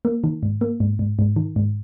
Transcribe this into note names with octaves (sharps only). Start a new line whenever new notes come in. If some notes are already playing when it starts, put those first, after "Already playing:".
A#3
D#3
G#2
A#3
G#2
G#2
G#2
D#3
G#2